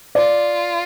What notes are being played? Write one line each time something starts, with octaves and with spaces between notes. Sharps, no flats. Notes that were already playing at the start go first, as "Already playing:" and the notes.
F4 D5